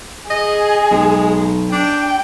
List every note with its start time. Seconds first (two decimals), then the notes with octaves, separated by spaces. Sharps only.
0.31 G#4 D#5
0.91 B1 G#3
1.72 D4 G5